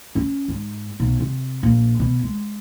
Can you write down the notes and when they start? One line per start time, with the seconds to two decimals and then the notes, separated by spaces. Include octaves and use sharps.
0.15 C#4
0.48 G#2
1.00 B1
1.20 C3
1.63 A#1
1.99 B2
2.23 G#3